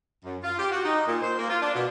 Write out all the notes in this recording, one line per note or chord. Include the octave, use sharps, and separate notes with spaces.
F#2
F4
G4
F#4
D#4
A#2
C5
A#3
F4
D4
B2